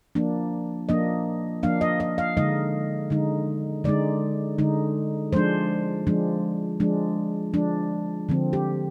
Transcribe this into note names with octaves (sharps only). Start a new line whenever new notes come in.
F3 A#3 D4
F3 A#3 D4 D#5
F3 A#3 D4 F5
D#5
D#5
F5
D3 G#3 D#4 D#5
D3 G#3 D#4
D3 G#3 D#4 D5
D3 G#3 D#4
F3 G#3 D4 C5
F3 G#3 D4
F3 G#3 D4
F3 G#3 D4
D3 F3 C4
G4